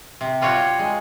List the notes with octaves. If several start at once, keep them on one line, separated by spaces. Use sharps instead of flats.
C3
G3 F4 F#4 C#5
G#3